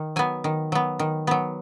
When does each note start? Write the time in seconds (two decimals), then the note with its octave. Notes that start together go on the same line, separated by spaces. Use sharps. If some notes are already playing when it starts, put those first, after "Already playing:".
Already playing: D#3
0.16 F#3 B3 G#5
0.44 D#3
0.72 F#3 B3
0.99 D#3
1.27 F#3 B3